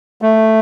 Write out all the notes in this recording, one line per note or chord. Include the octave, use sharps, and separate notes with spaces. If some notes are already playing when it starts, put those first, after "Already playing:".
A3